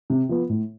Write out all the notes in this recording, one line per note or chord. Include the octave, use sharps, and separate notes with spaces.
C3
F3 B3
A2